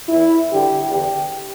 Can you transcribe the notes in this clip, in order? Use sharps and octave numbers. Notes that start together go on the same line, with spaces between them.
E2 E3 E4
G2 D3 G4
E2 D3 G4